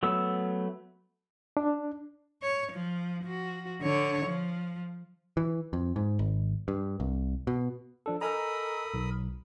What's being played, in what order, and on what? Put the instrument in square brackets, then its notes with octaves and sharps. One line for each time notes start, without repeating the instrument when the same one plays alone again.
[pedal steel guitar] F#3 A3 B3 E6
[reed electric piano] D4
[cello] C#5
F3
F3 F#4
D3 C#5
F3
[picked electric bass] E3
F2
G#2
G#1
G2
C2
B2
[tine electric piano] F3 D4 A4
[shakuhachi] A4 [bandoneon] A#4 B5 D#6 [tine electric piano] D#5 G#5 A#5
[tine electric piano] B1